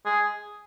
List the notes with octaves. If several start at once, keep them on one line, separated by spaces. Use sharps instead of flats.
G#4